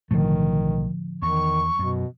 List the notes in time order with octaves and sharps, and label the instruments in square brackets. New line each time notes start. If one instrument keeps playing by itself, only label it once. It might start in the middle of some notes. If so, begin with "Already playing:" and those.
[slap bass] B1 A3 [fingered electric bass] A2 D3 F3 [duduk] D#3
[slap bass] E2 [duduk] D#3 [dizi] C#6
[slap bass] F#2 [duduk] B2